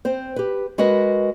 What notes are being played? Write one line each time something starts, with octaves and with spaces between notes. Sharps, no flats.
C4 C5
G4 B4
G#3 F#4 A#4 B4 D#5